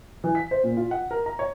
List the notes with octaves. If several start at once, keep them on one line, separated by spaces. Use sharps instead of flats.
E3
B6
C5
A#2
F4
F#5
A#4
A#5
C#5